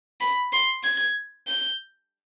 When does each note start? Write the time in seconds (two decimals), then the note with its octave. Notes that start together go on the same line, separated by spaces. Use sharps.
0.20 B5
0.53 C6
0.84 G#6
1.47 G6